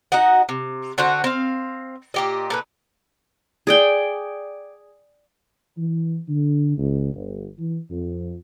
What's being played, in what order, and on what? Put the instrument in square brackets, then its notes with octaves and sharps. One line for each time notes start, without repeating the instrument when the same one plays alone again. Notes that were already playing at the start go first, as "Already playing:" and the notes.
[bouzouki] D#4 F#4 D#5 F#5
C3
D3 C4 F#4 F#5
C4 F5
A#2 G4 D#5
A#2 A3 B4
[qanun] G#4 D5 G5
[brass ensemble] E3
D3
C#2
G1
E3
F2